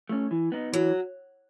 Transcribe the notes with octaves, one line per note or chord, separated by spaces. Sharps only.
A3 C#4
E3
B3 D#4
E3 F#3